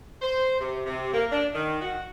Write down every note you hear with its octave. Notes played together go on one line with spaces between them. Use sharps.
C5
C3
C3
A#3
D4
D#3
F#4